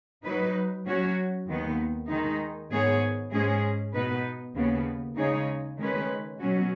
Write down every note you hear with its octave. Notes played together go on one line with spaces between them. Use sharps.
F#3 D#4 B4
F#3 C#4 F#4 C#5
D#2 D#3 B3
D#3 G#3 D#4
G#2 D#3 B3 G#4 C#5
G#2 G#3 C#4 G#4
B2 B3 D#4 B4
D#2 C#3 B3
C#3 G#3 D#4 G#4 C#5
D#3 G#3 C#4 B4
B2 F#3 C#4 F#4